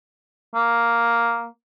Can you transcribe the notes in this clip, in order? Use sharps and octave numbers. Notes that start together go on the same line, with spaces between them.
A#3